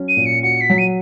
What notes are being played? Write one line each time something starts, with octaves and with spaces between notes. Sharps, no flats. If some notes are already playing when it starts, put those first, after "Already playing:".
Already playing: F#3 C#4
D#7
A#2
C#7
F#4 C#7
B6
F#3
D#7